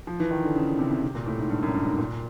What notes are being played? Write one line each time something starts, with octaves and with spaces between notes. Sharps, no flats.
F3
E3
D#3
D3
C#3
C#3
C3
C3
C3
A#2
A2
G#2
G2
F#2
G2
G#2
A#2